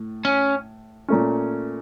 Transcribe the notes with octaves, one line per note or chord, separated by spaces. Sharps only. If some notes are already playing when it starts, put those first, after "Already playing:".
Already playing: A2
C#4
A#2 A3 C#4